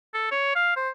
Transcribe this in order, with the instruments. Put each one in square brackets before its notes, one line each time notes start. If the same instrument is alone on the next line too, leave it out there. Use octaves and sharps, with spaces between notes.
[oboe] A4
C#5
F5
C5